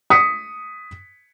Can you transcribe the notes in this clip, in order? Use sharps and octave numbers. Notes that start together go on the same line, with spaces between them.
D#6 B6 C#7